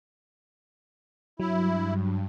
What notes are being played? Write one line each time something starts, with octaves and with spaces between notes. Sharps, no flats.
G2 F#3 E4